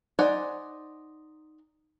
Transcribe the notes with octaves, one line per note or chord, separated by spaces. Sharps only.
D#4 C5 D5 F#5 G#5